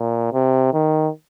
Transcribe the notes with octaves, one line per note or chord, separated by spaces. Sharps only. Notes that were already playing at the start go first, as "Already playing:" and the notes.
Already playing: A#2
C3
D#3